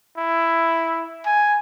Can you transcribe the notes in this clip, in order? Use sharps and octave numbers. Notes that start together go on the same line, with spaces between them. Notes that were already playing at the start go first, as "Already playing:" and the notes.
E4
G#5